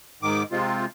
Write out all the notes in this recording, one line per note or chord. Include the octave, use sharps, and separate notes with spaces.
G#2 D#3 D6
C3 G#3 C4 F4